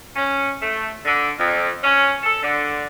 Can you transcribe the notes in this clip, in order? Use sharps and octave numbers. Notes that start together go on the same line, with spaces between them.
C#4
A3
D3
F2
C#4
A4
D3